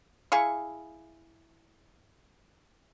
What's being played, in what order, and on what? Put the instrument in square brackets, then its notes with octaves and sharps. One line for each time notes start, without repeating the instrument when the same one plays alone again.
[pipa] E4 G#4 F5 C#6